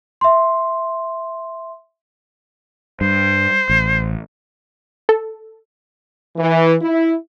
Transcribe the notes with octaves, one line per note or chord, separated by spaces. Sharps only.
E5 C6
G2 C5
A1
A4
E3
E4